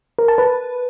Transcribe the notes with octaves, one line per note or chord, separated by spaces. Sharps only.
A#4
A5
B4